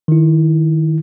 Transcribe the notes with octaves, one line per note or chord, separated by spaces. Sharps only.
D#3 E4